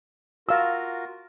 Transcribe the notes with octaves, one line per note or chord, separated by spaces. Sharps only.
F4 F#4 A#4 F5 E6